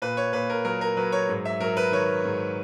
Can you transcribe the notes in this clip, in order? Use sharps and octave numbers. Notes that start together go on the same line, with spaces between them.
A#2 B4
C#5
A#2 B4
A#4
F#3 A#4
A#4
F#3 B4
C#5
G#2
E5
F#3 A#4
B4
D#3 C#5
G#2